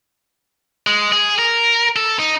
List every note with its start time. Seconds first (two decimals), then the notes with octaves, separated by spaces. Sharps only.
0.87 G#3
1.13 G#4
1.39 A#4
1.96 A4
2.19 D#4